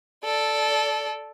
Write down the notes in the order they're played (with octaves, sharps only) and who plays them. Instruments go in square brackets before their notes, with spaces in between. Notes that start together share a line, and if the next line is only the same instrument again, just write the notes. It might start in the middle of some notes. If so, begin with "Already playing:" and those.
[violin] A4 D5